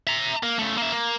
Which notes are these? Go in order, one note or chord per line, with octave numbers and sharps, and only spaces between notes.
E5 A#5
A#3
C#3 A3
A#3 E5
A#3